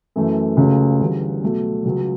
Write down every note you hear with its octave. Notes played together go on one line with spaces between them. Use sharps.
F#2 E3 A3
C#2 C#3 F#3 A3 C#4
D2 C#3 E3 G3
B2 F#3 A3
C#2 C#3 F#3